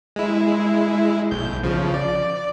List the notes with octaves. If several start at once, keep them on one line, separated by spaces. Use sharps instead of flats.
G#3 E4
B1 G6
C#3 F3
D5